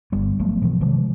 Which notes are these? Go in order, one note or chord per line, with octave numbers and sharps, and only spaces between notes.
G1 G3 B3
F3 F#3 A3 B3
B2 E3 F3
C3 D#3 F3 G#3